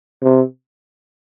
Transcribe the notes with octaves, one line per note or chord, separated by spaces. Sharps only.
C3